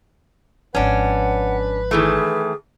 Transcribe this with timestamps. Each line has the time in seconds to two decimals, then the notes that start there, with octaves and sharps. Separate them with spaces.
0.75 G#1 F3 C#4 D4 B4 F#5
1.91 D#3 E3 A3 G#4